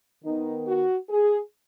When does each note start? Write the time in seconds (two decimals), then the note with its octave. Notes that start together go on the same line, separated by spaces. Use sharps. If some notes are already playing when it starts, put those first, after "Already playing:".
0.24 D#3 B3 D#4
0.67 F#4
1.09 G#4